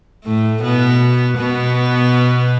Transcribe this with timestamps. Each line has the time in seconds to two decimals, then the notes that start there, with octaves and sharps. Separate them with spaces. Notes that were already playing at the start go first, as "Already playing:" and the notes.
0.25 A2 A3
0.62 B2 B3
1.37 B2 B3